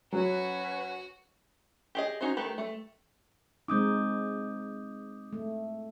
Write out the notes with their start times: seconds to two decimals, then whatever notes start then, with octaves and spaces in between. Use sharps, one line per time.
0.12 F#3 C#4 F#4 B4 F#5 F#6
1.95 G4 G#4 D#5
2.21 C#4 D#4 F#4 C5
2.37 D#3 A3 G4 B4
2.58 A3
3.68 G#3 C4 D#4 D6 D#6 G6
5.33 A3